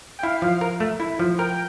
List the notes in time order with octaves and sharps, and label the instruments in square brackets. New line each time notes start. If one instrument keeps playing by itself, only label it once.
[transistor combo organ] G5
[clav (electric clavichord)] E4 [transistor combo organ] F5
[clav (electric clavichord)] F3
A#4
A3
E4
F3
[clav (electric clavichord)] A#4 [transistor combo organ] G5